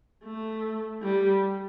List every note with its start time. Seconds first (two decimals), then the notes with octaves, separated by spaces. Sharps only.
0.24 A3
1.02 G3